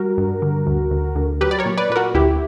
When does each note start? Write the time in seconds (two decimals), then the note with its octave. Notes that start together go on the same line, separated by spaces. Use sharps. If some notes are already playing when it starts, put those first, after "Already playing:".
Already playing: G3 F#4 A#4
0.18 G2
0.42 D3
0.67 D2
0.91 D2
1.15 D2
1.41 F#3 G4 B4
1.51 D5
1.59 A#4 C#5
1.66 A#2
1.78 B4 D5
1.90 A#2 B4
1.96 F#4 A#4
2.14 D2 E4 G4